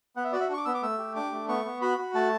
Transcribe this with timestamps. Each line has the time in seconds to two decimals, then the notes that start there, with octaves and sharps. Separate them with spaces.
0.16 B3 F#5
0.24 E5
0.32 F#4 D5
0.40 E5
0.49 D4 C#6
0.58 D6
0.65 B3 E6
0.75 D6
0.82 A3 E6
0.98 G4
1.16 D4 D6
1.32 A3
1.48 B3 C#6
1.65 B3
1.82 F#4 B5
1.98 F#4
2.14 A3 A5